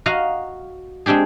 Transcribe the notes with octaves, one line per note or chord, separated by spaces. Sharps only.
F#4 D#5 F5 A#5
G#3 C4 D4 G4 G#4